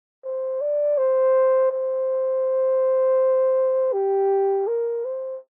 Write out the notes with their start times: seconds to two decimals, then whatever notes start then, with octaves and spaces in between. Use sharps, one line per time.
0.24 C5
0.61 D5
0.98 C5
1.72 C5
3.93 G4
4.68 A#4
5.05 C5